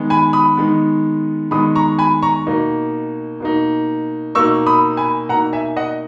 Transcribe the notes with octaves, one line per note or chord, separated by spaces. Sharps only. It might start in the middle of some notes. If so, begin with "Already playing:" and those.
Already playing: D#3 G#3 B3
G#5 B5
B5 D#6
D#3 G#3 B3
D#3 G#3 B3 B5 D#6
A#5 C#6
G#5 B5
A#5 C#6
B2 A#3 D#4
B2 A#3 D#4
B2 A#3 D#4 C#6 E6
B5 D#6
G#5 B5
B2 A#3 D#4 F#5 A#5
E5 G#5
D#5 F#5